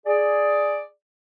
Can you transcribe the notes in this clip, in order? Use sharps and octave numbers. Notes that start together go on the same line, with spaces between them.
G#4 D5